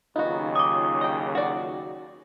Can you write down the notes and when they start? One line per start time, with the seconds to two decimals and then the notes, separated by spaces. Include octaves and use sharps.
0.16 D#2 C#3 F#3 B3 D#4 F4 F#4
0.56 D6 D#6
1.01 D#5 G5
1.35 F#4 D5